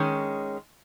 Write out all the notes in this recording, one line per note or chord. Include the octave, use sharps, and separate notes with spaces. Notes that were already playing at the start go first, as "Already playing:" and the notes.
Already playing: D#3 G#3 C#4